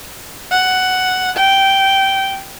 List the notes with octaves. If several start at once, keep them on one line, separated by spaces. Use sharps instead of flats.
F#5
G5